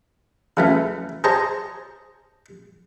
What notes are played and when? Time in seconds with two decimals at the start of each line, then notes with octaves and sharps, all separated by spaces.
0.57 C#3 E3 A3
1.24 G#4 C5 C#5 A5 A#5